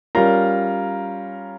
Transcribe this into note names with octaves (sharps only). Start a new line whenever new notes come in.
G3 C#4 F4 A#4 A#5